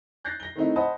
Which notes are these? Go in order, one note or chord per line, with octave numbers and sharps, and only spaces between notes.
F#6 G6 A6 A#6 C7
A#6 G7
D#3 A3 C4 D#4 E4
C5 D#5 F#5 A5 B5 D#6